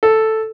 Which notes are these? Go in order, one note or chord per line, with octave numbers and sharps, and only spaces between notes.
A4